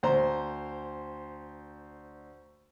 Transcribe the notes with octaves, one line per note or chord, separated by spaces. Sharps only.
D2 C5 A#5 C6